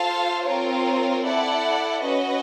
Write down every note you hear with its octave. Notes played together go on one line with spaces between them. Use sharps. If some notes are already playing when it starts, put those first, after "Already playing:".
Already playing: F4 A4 C5 F5 A5
C4 F4 A#4 C#5
E4 A4 D5 F#5
C#4 F#4 B4 D#5